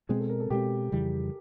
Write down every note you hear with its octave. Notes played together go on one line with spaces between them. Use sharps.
B2 G#3 C4 G#4
A4
A#4
A4
B2 G#3 C4 G4
F2 C#3 E3 G3